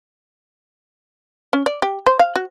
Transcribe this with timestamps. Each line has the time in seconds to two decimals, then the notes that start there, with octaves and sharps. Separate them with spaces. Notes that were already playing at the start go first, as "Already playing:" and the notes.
1.53 C#4
1.66 D5
1.82 G4
2.06 C5
2.19 F5
2.36 F#4